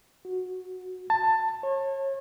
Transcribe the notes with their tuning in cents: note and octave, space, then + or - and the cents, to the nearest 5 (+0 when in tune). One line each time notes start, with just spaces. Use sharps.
F#4 -10
A5 +15
C#5 -30